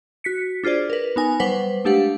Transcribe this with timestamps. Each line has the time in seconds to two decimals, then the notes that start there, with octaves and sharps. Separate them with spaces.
0.24 F#4 B6 C#7
0.64 D4 F4 G#4 C5 D5
0.90 A#4 B4
1.16 B3 D#4 G#5
1.40 F#3 G3 B4 C5 F#5 B6
1.85 G#3 A3 D4 G4 F5 F#5